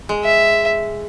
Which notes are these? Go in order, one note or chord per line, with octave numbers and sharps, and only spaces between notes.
G#3
E5